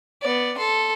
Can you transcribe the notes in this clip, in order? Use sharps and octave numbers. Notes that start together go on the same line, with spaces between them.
B3 D5
A4 C6